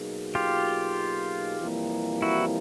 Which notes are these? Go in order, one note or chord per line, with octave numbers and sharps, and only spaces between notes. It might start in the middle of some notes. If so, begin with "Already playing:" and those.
Already playing: B2 F#3 A#3 D#4 G#4
F4 G4
F2 C3 E3 G3 A#3
E4 F#4